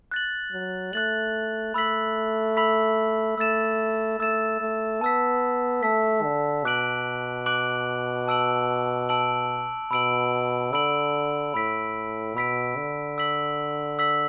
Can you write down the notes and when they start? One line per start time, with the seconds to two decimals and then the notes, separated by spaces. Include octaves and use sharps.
0.11 F#6 A6 F#7
0.52 F#3
0.93 A3 F#6 A6 F#7
1.74 A3 B5 E6 B6 F#7
2.57 B5 E6 B6 F#7
3.38 A3 E6 A6 E7
4.20 A3 E6 A6 E7
4.61 A3
5.01 B3 A5 E6 B6
5.83 A3 A5 E6 B6
6.24 D3
6.64 B2 D6 F#6 D7 F#7
7.46 D6 F#6 D7 F#7
8.28 A5 E6 D7 F#7
9.09 A5 E6 D7 F#7
9.91 B2 B5 E6 D7 F#7
10.73 D3 B5 E6 D7 F#7
11.54 A2 B5 E6 B6 D7
12.36 B2 B5 E6 B6 D7
12.76 D3
13.18 E6 B6 F#7
13.99 E6 B6 F#7